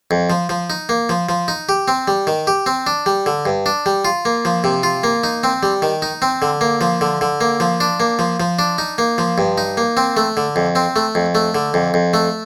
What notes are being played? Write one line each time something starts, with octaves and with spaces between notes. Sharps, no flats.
F2
F3
F3
D#4
A#3
F3
F3
D#4
G4
C4
G3
D#3
G4
C4
D4
G3
D3
G2
D4
G3
F4
A#3
F3
C3
F4
A#3
D#4
C4
G3
D#3
D#4
C4
D3
A#3
F3
D3
D3
A#3
F3
D4
A#3
F3
F3
D4
D#4
A#3
F3
G2
D#4
A#3
C4
A3
D3
F2
C4
A3
F2
A3
D3
F2
F2
A3